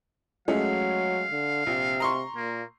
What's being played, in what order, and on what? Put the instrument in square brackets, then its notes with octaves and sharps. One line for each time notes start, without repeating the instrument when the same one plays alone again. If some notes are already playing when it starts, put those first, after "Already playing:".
[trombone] F#3 [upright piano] G#3 A3 C#4 [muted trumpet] F5
[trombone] D3
[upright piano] A#1 [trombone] C3
[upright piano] A#5 C6 C#6
[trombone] A#2 [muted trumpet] A#3